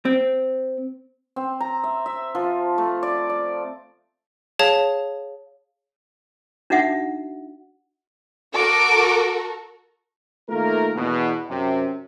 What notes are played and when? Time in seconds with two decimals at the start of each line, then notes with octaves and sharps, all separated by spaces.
0.05 C4
1.36 C4
1.60 A#5
1.84 E5
2.06 E5
2.35 F3
2.78 A3
3.03 D5
3.30 D5
4.59 G#4 C#5 F5 A5
6.70 D4 D#4 F#4 E5 F#5
8.55 F#4 A4 A#4 D6
10.49 D#3 A3 A#3 F4 A#4
10.96 E2 B2
11.50 F#2 C3